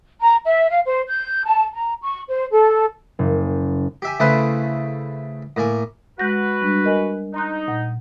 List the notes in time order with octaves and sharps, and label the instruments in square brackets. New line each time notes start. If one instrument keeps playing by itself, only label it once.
[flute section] A#5
E5
F5
C5
G6
A5
A#5
C#6
C5
A4
[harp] F#1
[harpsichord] G4 E5 G#5
C#3 A3 E4 G#4 B4 C5
A2 A#3 G#5
[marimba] G#3 G6 A#6 [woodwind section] F#4 B4
[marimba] G3 D4
A#4 D#5 G#5
[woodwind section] D#4 [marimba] A#5 C6 F#6
[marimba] A#2 F#5